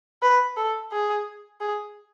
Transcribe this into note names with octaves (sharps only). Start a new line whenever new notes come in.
B4
A4
G#4
G#4